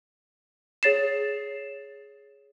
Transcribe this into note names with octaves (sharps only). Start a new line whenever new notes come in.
G#4 C#5 A6 C7 E7